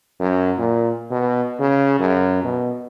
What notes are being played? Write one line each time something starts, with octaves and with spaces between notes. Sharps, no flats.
F#2
A#2
B2
C#3
F#2
B2